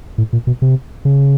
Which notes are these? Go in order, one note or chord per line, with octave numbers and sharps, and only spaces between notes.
A2
A#2
B2
C3
C#3